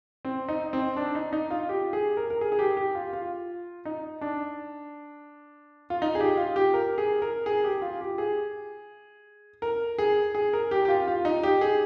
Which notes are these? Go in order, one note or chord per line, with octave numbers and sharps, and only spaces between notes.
C4
D#4
C4
D4
D#4
D#4
F4
G4
G#4
A#4
A#4
G#4
G#4
G4
G4
F4
F4
D#4
D4
F4
D#4
G#4
G4
F4
G4
A#4
G#4
A#4
G#4
G4
F4
G4
G#4
A#4
G#4
G#4
A#4
G4
G4
F4
F4
D#4
G4
G#4